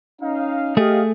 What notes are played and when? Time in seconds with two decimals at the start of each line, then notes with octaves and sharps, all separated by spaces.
0.22 C#4 D#4 F5
0.77 A3 G4 G#4 D#5 F5